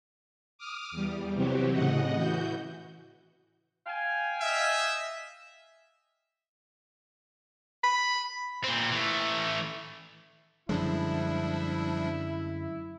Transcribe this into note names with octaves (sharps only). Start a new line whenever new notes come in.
D6 D#6 F6
E2 G3
C3 E3 F#3 C4 F#4 G4
A2 C#3 D#5 F#5
E3 F#4 G6
F5 G5 G#5
D#5 E5
B5
A#2 C4
E3 A3
F#2 D3 F3 G3 G#3 D4 E4